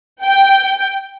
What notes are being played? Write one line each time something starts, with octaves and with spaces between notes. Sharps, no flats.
G5